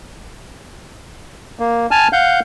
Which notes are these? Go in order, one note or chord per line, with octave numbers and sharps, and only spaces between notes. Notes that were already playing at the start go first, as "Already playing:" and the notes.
A#3
G#5 A5 F6
F5 F#5 G6